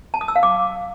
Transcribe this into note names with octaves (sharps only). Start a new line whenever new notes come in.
A5
D#6
E6
F5
D6